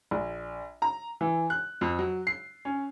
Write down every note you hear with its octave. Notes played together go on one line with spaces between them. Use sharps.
A#1
A#5
E3
F#6
F2
F#3
C7
C#4